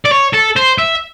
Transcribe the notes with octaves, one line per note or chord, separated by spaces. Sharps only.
D5
C#5
A4
C5
E5